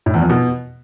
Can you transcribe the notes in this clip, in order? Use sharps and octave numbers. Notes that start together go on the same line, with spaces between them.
A2
E2
F2
B2